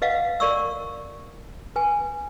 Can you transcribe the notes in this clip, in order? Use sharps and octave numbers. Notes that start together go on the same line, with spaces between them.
B4 D#5 F5 F#5
A#4 D5 C#6 E6
B4 G#5